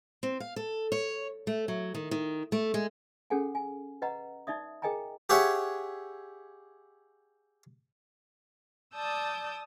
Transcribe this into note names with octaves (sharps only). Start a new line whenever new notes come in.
C4
F5
A4
C#5
A3
F#3
D#3
D#3
A3
G#3
C#4 G#4 A4 F#5 G#5
G#5
B4 D#5 F#5 A#5
D#4 D5 E5 D#6
G#4 A#4 D#5 G5 G#5 A#5
G4 G#4 C#5 E5 F#5
D5 A5 D#6 E6 G6